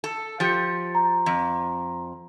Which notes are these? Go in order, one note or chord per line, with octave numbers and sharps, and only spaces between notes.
A4
F3 G4 A6 C#7
A#5
F2